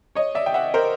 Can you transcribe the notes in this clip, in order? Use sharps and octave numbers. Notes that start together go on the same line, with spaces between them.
C#5 D#5
D5 E5
G5
E5 F#5
A#4 C5